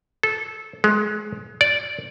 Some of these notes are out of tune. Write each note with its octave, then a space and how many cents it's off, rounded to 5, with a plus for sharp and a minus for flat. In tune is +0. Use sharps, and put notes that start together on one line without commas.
A4 -15
G#3 +25
D5 -5